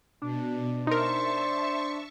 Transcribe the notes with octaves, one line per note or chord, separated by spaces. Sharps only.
B2 D4
D#4 A#4 C5 E5 A5 C#6